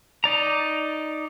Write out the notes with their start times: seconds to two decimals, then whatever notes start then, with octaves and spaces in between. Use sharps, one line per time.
0.24 D#4 D5 A#5